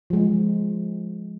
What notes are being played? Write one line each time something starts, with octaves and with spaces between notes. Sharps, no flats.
F3 G#3